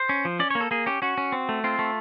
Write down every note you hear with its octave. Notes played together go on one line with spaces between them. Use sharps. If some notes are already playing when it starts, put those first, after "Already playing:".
Already playing: C5
C#4
F3
C#4 D5
A#3 C#5
A4
A#3 G#4
C#4 G4
C#4 F#4
C#4
C4
A3
C4 F4
A3